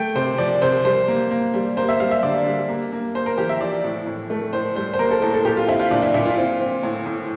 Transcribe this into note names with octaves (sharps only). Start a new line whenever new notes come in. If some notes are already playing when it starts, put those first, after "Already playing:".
Already playing: A3 G5
C3 C5
F3 D5
C3 C5
G3 C5
A#3
A#3
G3
A#3 C5
E5
G3 F5
E5
D3 D5
G3
A#3
A#3
A#3 C5
A#4
E3 G4
E5
F3 D5
A2
A2
A3
A2 C5
G3 C5
C5
A#3 A#4
A4
A2 A4
A4
A#2 G4
F4
C4 E4
F4
A#2 D4
E4
A#2 E4
F4
C4
C4
A2
A2